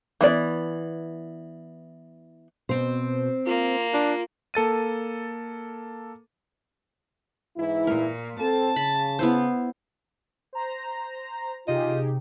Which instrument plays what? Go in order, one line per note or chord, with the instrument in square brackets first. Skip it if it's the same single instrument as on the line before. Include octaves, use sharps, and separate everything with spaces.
[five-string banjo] E3 B3 D5
[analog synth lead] B2 [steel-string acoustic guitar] C4 C5
[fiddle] A#3 [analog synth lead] F4
[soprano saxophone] D4 [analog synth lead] F4
[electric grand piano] A#3 A4 A6 D#7
[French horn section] G#2 E3 E4
[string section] A#2 [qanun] A#4
[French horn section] C4 A4 [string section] A5
[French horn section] C#3 [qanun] B5
[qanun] B3 E4 C5
[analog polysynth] C5 A#5
[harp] C3 [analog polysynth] D#4 G4 G#4 [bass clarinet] F4 [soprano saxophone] D#5